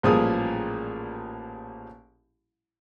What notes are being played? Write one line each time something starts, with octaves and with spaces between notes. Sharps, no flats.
A1 A#2 F3 G3 G#4 D#6